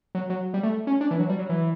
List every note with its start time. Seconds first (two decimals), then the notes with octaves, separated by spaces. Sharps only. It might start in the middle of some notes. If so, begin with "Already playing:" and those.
0.15 F#3
0.30 F#3
0.54 G3
0.63 A3
0.87 C#4
1.01 D4
1.11 E3
1.20 F#3
1.29 G3
1.39 F#3
1.49 E3